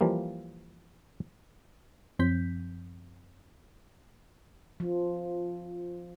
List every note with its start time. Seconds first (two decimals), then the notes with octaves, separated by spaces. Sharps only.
0.01 E3 F3 G3 A#3
2.19 F#2 F3 C4 G6 B6
4.80 F3